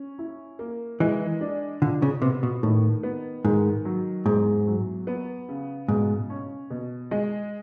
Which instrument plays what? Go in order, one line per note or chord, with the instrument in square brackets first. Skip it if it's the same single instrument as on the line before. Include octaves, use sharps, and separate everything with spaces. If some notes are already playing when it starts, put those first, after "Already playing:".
Already playing: [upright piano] C#4
E4
A#3
[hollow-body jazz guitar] E3 [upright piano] G#3
[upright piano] D4
[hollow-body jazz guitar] D3 [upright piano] F4
[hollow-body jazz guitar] C#3
[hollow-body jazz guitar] C3 [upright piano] B3
[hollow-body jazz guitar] B2
[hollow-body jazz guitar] A2 [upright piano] D#3
[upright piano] B3
[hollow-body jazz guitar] G#2 [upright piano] D#3
[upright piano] F#3
[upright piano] E2 [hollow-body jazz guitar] G#2
[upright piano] F#3
B3
C#3
[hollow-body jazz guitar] G#2 [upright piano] B2
[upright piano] C#4
B2
G#3